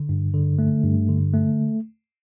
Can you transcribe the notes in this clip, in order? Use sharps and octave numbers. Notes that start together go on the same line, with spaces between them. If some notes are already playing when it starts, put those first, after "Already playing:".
Already playing: D3
G2
D3
A3
G2
D3
A3